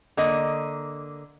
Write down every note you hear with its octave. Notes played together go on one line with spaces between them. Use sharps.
D3 A#3 D#5